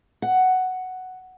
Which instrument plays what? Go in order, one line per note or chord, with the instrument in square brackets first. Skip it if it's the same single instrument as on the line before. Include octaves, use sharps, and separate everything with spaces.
[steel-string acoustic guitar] F#5